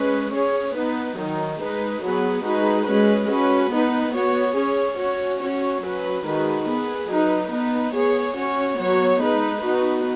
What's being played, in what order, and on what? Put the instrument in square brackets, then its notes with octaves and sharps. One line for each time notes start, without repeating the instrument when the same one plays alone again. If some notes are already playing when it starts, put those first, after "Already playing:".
Already playing: [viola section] G#3 C#4 B4
C#4 G#4 C#5
B3 D#4 B4
D#3 F#3 D#4
G#3 D#4 B4
F#3 B3 G#4 B4
G#3 D#4 F#4 B4
G#3 C#4 B4
C#4 F#4 B4
B3 D#4 B4
B3 F#4 C#5
C#4 G#4 C#5
C#4 F#4 C#5
C#4 F#4 C#5
F#3 C#4 B4
D#3 G#3 D#4 F#4 B4
B3 G#4 B4
F#3 D#4 B4
B3 D#4 B4
B3 G#4 C#5
C#4 F#4 C#5
F#3 B3 F#4 C#5
G#3 D#4 B4
B3 D#4 F#4 B4